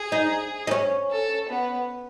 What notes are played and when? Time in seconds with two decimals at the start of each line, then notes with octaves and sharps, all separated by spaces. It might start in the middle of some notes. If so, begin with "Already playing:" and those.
Already playing: G#4
0.12 D#4
0.67 D#4
0.71 C#4
1.11 A4
1.49 B3